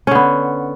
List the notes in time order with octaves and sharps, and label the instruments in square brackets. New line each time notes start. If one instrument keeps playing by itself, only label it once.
[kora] C#4
D3
B3